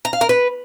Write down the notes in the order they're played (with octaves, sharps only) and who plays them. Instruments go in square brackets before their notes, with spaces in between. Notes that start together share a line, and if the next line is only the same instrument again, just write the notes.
[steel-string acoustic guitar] A#5
F5
A#4
B4